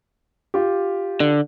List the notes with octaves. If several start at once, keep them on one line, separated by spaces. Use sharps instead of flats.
F4 G4
D3